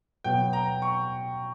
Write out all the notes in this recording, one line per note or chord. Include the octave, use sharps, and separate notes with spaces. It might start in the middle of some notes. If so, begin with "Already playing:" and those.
B2 F#3 B3 G5
A#5
C#6